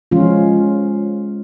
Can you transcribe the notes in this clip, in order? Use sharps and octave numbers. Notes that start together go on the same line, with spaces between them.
F3 G#3 C#4 F4